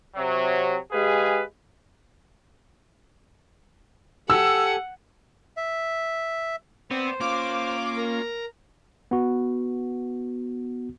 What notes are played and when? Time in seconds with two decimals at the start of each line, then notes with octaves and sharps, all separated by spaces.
0.16 C3 F#3
0.92 G#3 G4 G#4 B4 F5
4.30 G4 A4 F#5 G#5 E6
5.57 E5
6.91 B3 C4 C5 D5
7.20 A#3 C#4 F4 F5 D6
7.97 A#4 A#5
9.11 B3 F#4